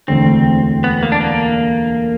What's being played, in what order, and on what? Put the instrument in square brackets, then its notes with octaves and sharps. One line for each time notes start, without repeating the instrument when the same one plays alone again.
[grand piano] E1 D2 D3 [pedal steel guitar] C4
[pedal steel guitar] B3
A#3
D4
A#3